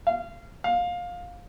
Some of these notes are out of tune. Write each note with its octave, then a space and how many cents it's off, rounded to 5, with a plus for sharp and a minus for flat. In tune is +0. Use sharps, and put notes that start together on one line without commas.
F5 -20
F5 +20